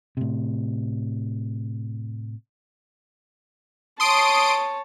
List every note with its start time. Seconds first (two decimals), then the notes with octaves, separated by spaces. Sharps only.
0.17 A2 C3
4.00 C#5 A5 C6 D#6 D7